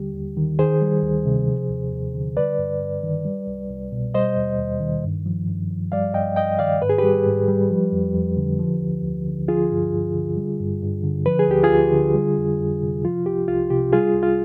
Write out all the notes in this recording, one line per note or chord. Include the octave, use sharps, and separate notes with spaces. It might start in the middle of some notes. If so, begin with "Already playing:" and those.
Already playing: D#2 D3 G3 G4
D#2
D#3
D#3 G#4 C5
G3
D2
C3
F3
D#2
D#2
D3
G3 B4 D5
G2
G2
D#3
G3
C2
C2
B2
G3 C5 D#5
D#2
D#2
D#3
G2
F3
G2
F3
G3 D5 F5
G2 D#5 G5
G2 D#5 G5
D#3 D5 F5
G#2 B4
G#4
G3 G4 B4
G#2
G3
F3
F2
F2
D3
F3
D2
D2
D3
F3 F4 G#4
G2
G2
D3
G3
G2
G2
D3
F3 B4
G#4
D2 G4
F4 G#4
D2
D3
G3
F2
F2
C3
F3 F4
C2 G4
C2 F4
C3 G4
G3 F4 G#4
C2
F4